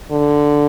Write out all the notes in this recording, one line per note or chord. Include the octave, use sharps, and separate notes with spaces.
D3